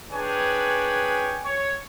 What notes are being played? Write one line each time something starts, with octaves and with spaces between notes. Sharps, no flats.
D4 G#4 B4 C#5 G5 G#5
C#5